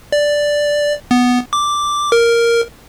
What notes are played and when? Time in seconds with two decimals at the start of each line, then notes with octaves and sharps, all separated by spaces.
0.12 D5
1.11 B3
1.53 D6
2.12 A#4